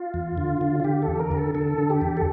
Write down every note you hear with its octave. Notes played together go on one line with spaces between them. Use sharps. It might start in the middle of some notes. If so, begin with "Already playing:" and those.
Already playing: F4
E2
D3
D3
F4
D3 G4
A4
E2
A#4
D3
A4
D3 A4
D3
G4
E2
A4